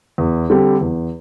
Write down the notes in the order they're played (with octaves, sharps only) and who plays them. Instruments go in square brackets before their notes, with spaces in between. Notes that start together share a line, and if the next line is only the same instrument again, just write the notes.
[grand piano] E2
D3 G3 C4 G4
E2